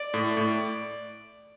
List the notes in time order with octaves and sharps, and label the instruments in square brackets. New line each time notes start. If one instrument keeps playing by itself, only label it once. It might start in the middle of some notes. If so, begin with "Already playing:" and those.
Already playing: [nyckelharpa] D5
[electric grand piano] A2
A2